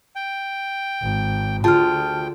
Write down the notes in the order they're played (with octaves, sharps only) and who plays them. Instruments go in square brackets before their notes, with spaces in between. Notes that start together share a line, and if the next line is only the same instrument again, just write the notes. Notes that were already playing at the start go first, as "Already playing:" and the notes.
[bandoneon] G5
[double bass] G#1
[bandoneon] D2 G5 [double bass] D3 [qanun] F4 G#4 [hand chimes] A5 F6